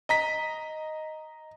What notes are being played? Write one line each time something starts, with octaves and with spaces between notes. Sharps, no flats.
D#5 A#5 B6